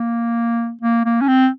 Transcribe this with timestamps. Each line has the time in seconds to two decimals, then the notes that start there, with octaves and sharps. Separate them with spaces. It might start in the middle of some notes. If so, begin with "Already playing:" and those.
Already playing: A#3
0.81 A#3
1.05 A#3
1.21 C#4
1.28 C4